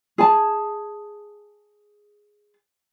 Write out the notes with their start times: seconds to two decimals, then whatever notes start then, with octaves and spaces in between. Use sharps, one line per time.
0.18 G#4 G#5 A5